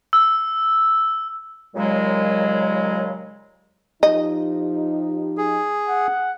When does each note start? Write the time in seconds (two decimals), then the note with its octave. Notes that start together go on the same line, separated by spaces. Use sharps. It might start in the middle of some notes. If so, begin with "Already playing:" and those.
0.13 E6
1.75 D#2 A#2 C#3 F#3 G#3
4.03 F3 D#4 G4 D#5
5.37 G#4
5.87 F#5